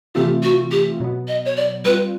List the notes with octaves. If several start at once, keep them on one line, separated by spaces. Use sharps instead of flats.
C3 E3 A3 C4 F4 G4
F#4
G4
B2 F#3 B3
D#5
C#5
D5
G3 C4 F4 B4